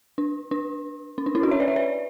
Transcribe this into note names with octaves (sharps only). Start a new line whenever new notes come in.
D4
D4
C#4
D4
C#4 E4
D4 F#4
C#5 E5
B4 D5
C#5 E5
B4 D5